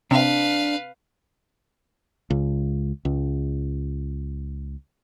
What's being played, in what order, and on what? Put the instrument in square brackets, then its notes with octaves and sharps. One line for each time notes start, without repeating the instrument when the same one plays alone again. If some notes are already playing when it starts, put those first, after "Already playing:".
[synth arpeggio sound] C3 [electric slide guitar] D4 [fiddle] B4 F5
[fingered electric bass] C#2
C#2